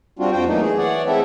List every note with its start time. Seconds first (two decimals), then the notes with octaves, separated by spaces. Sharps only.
0.19 G3 C4 D4 F4 F#4
0.32 F2 D4 F4 F#4 C5 G5
0.47 E3 F#3 A3 A#3 D#4
0.61 G#4
0.78 E3 C#5 D5 F#5
1.07 G#3 A3 C4 E4 A4 E5